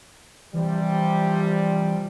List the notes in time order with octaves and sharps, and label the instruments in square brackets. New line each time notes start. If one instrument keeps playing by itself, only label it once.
[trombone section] C3 F3 G3 [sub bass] E3